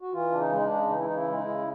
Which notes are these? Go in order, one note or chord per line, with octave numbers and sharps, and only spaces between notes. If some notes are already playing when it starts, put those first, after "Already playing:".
F#4
E3 F4
C#3 D4
D#4
G#3 D#4
D4
C#3
E3 D#4
E4
D#4
C#3
E4
G#3
D#4
E4
C#3